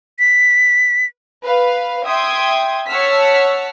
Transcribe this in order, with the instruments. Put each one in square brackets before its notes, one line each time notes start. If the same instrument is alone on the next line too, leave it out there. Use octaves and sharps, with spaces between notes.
[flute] B6
[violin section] B4 F5
E5 G5 C6 D#6 G#6
C#5 F#5 A5 E6 F6 B6